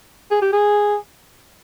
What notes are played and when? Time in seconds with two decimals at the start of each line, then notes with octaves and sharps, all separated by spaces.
0.31 G#4
0.42 G4
0.53 G#4